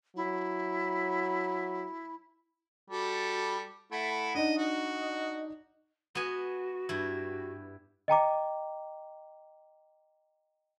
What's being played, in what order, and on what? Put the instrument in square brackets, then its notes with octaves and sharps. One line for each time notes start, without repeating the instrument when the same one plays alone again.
[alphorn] F#3 [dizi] E4
[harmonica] G3 A4 [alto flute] F#4
[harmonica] A3 E4 [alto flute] F#5
[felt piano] D4 D#4 [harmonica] D#5
[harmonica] F#4 [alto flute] D#5
[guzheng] B3 G#5 [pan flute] F#4
[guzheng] G2 E4
[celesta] D#5 G5 A#5 D6